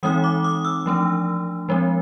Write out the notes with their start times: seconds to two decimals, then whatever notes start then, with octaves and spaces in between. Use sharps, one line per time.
0.03 E3 G#3 C4 D#4 D#6
0.24 D6
0.44 D#6
0.65 E6
0.86 F3 A3 D4
1.69 F3 G#3 C4